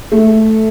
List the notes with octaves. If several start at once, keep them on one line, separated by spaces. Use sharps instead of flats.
A3